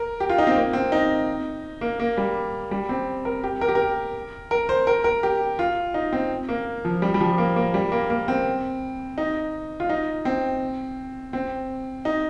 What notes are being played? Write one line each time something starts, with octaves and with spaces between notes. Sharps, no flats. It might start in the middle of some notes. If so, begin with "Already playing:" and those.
Already playing: A#4
G4
F4
D#4
C4
A#3
C4
D#4
A#3
A#3
G3
G3
C4
A#4
G4
A#4
G4
A#4
A#4
C5
A#4
A#4
G4
F4
D#4
C4
A#3
F3
G3
G3
F3
A#3
A#3
G3
A#3
A#3
C4
D#4
F4
D#4
C4
C4
D#4